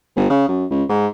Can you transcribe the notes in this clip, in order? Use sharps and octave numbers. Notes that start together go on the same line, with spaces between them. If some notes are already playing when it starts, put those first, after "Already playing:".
G1
C#3
F#2
C#2
G#2